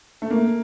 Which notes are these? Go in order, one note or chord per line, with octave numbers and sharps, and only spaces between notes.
A3
A#3